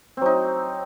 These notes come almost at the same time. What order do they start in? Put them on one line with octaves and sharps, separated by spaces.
C4 F#3 D#4